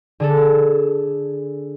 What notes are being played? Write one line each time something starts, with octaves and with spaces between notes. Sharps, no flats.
D3 G#4 A4